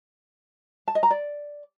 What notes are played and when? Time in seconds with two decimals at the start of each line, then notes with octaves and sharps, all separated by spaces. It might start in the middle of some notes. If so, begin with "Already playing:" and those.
0.88 A5
0.95 D#5
1.03 A#5
1.11 D5